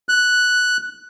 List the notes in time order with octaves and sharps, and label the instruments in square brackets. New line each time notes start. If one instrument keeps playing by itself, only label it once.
[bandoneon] F#6